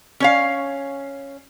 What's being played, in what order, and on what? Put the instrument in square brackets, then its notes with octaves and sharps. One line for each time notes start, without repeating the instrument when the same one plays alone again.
[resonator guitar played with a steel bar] C#4 C#5 F5